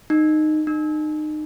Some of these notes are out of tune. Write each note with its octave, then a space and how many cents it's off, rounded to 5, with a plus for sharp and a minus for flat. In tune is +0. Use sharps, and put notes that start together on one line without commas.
D#4 -15
D#4 -30